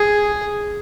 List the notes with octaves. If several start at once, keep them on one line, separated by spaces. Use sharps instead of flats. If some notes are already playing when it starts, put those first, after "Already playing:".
Already playing: G#4